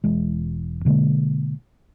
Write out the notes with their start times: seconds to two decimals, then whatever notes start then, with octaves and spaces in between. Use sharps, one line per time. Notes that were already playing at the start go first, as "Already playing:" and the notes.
0.04 E1 E2 G#3
0.85 B2 D3 G#3 A#3